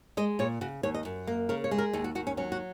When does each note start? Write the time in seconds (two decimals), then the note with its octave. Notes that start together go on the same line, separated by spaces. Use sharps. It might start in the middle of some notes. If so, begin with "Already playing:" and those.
0.17 G#3 D#5
0.39 A#2 C#5
0.61 C#3 F#4
0.83 D#2 C#5
0.94 D#5
1.05 F#2
1.27 A#3
1.49 C#3 A#4
1.64 C#5
1.71 G#3
1.78 A#4
1.93 D#2 D#4
2.04 F#4
2.15 D#2 F#4
2.27 C#4
2.37 F#3 C#4
2.52 F#4